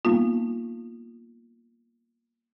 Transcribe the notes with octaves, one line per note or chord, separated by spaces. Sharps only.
G3 A#3 B3 D#4 F4